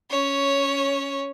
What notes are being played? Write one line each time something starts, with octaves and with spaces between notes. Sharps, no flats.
C#4 C#5